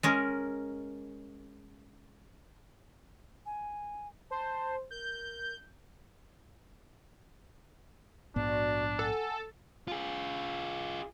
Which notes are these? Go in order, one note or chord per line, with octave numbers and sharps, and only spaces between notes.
G#3 C#4 A#4
G#5
C5 A5
A#4 G6
A#1 G#2 B3 D4 F#4 D5
A4 F#5 G#5
F4 G#4